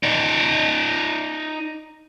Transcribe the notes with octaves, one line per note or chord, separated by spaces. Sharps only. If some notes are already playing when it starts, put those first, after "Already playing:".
D#4 D5